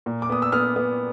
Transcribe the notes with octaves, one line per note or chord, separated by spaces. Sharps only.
A#2
D6
B3 D#6
E6
B3 D#6 F6
B3